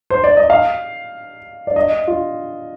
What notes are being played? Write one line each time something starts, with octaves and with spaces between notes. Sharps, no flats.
C5
D5
D#5
F5
D5
D#5
F4